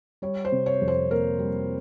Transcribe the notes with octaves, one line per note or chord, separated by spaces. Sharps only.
G3 C#5
C5
C3
C#5
F2
C5
A#3 A#4
G3